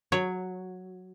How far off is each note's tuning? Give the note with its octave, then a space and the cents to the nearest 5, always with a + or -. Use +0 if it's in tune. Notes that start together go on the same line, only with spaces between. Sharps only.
F#3 -10 C#5 +0